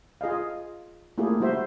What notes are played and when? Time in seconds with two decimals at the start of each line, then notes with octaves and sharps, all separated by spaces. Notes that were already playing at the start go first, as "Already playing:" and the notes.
0.21 F4 G#4 D#5 F5
1.18 A3 A#3 E4 F4 G4 G#4
1.40 G3 E4 F#4 C5 E5